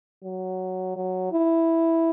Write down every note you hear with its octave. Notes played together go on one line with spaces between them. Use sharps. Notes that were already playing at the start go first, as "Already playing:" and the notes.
F#3
F#3
E4